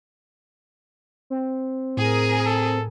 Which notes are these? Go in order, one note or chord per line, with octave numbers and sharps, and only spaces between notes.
C4
A2 G#4 A#4
A4